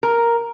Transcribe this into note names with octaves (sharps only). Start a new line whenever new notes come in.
A#4